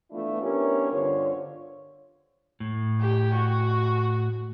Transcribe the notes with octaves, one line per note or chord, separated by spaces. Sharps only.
E3 A3 B3 D4 E4 F4
B3 C#4 D4 E4 G4 A#4
G2 D3 F4 C5 C#5
A2
G4
F#4